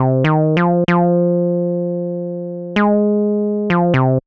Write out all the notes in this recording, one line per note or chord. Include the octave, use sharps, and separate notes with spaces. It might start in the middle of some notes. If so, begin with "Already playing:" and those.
Already playing: C3
D#3
F3
F3
G#3
F3
C3